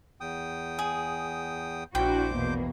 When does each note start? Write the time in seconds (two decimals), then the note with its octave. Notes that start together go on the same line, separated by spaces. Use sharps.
0.21 E2 G5 D#6
0.79 G#4
1.95 A#1 D4 E4 F#4 C5 G5 D6 G6
2.34 E2 B2 A#3